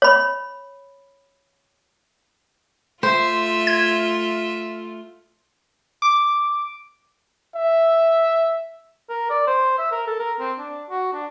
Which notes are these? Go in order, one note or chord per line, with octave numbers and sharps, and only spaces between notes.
C#5 B5
A3 F4 C5 E5
G#6
D6
E5
A#4
D5
C5
E5
A#4
A4
A#4
C4
D4
F#4
D4